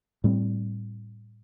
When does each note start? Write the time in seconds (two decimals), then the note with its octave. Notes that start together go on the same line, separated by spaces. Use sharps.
0.24 A2 G3 C4